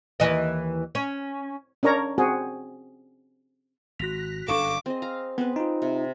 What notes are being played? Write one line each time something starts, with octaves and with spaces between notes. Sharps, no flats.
D#2 E3 D#5
C#4
C#4 D4 A#4 C#5 A#5
C4 F#4 G#4
G#1 F#4 F#6 A#6 B6 F7
G1 F#2 D4 A4 F5 C#6 D6
C4 G#4 D#5
F5 A#5
B3 C4 G#4 B4
D#4 F4
C3